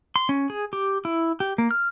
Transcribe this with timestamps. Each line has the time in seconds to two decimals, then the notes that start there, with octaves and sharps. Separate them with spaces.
0.16 C6
0.29 C#4
0.50 G#4
0.73 G4
1.05 E4
1.40 G4
1.58 A#3
1.71 F6